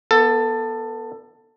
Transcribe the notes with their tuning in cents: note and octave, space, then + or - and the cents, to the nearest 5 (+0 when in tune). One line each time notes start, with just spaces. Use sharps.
B3 -20 A4 +15